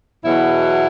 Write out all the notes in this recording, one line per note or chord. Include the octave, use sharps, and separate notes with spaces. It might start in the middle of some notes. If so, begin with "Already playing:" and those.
E2 B2 F#3 E4